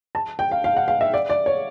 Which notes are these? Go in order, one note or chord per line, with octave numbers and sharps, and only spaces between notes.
A5
G5
F5
F5
F#5
F5
E5
D5
D5
C#5